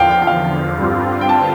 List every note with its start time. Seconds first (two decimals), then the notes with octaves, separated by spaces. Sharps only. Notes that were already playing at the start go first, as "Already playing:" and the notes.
Already playing: E2 D3 F3 F5 G5
0.11 G5
0.22 G5
0.27 F5
0.78 G2 D3 G3 C4 F4
1.21 G5
1.29 A5